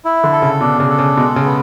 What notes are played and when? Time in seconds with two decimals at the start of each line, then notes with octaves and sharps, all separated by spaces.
0.05 E4
0.24 D3
0.32 A4
0.42 C#3
0.60 B2 D4
0.80 C#3
0.90 A4
0.99 C#3
1.17 B2 G#3
1.36 C#3
1.45 B3